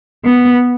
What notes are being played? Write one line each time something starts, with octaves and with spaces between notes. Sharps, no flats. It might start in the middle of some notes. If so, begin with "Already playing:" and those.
B3